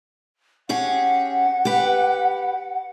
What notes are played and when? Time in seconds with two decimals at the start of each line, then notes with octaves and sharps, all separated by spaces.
0.69 C#4 G4 G#4 F#5
1.65 G4 B4